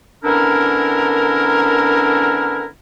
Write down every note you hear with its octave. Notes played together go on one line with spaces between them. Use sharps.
D3 B3 C#4 D4 E4 A#4